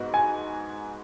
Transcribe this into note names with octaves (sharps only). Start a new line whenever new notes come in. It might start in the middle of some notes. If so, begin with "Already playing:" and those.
Already playing: G#2 B3 F#4
G#5